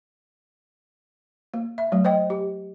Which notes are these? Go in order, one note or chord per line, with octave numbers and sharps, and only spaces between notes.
A#3
E5
F#3 A3
C5 D#5 G5
G4